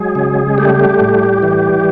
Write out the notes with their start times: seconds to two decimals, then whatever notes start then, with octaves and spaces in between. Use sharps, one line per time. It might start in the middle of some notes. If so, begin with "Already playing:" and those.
Already playing: F#3 G#3 G#4
0.15 C#3
0.58 G3 A3 G4
1.01 A2
1.43 E3